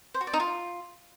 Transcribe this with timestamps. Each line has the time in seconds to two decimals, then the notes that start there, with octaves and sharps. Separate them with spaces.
0.14 C5
0.21 F#4
0.27 D5
0.33 D#4
0.40 F4